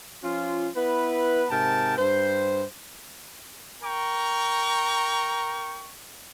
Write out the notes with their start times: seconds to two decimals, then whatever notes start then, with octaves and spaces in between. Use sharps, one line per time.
0.23 F3 C#4 F4
0.76 B3 E4 B4
1.50 G#2 C3 A#4 G5 A5
1.97 G2 C5
3.83 A#4 G5 A#5 C#6